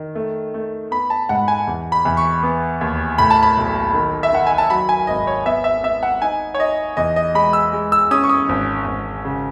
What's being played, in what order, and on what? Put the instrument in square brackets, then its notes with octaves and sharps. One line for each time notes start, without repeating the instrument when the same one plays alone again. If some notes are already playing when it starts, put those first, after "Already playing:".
Already playing: [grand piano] D#3
A3
A3
B3 B5
A5
G#2 F#5
G#5
E2
B5
E2
C#6
B3
D#2
A2 B5
A5
B5
B1
D#3
E5
D#3 F#5
G#5
A5
F#3 B5
G#5
G#1 D#5
C#5
B3 E5
E5
B3 E5
F#5
D#4 G#5
C#5
D#4 D#5
E2 D#5
D#5
G#3 B5
E6
G#3
E6
C#4 D#6
C#6
D#6
G#1
G#1
C#3